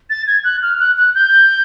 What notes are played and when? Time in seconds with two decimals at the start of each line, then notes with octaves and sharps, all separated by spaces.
0.10 A6
0.27 G#6
0.44 F#6
0.62 F6
0.79 F#6
0.97 F#6
1.15 G6